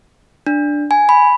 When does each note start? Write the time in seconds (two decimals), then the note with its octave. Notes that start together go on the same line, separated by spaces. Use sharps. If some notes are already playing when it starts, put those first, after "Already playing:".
0.46 D4
0.91 G#5
1.09 B5